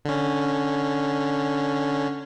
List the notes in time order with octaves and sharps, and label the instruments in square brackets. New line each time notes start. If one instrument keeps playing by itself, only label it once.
[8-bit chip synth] D3 C#4